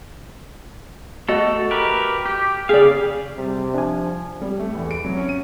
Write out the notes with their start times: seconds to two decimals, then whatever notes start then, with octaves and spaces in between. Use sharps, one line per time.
1.29 A3 F#4 A4 D#5
1.71 G4 A#4 B4
2.26 G4
2.69 C#3 G4 G#4 D5 F5
3.37 C3 G3
3.75 F3 D4 G#5
4.42 G3
4.60 A3
4.75 E2
4.91 D7
5.05 F#3
5.17 C#4
5.29 D#7